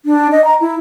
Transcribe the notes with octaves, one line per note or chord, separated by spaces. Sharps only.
D4
D#5
A#5
E4